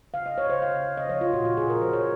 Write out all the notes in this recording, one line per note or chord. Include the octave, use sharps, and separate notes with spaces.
C#3 F5
D#5
C#3 C#5
C5
C#3 F5
C#3
D#5
F3 C#5
F4
A#2 F#4
F#4
A#2 G#4
A#4
F3 C5
C#5